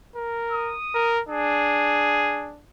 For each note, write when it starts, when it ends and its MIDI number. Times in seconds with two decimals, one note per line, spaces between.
0.16 0.75 70
0.52 1.15 87
0.95 1.21 70
1.29 2.61 62
1.29 2.51 68